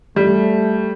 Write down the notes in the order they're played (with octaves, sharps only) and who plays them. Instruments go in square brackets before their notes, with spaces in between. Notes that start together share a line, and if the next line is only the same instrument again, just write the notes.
[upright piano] G3 [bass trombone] A3